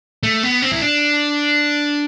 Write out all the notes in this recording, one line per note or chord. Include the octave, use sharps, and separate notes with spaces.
A3
B3
C4
E4
D4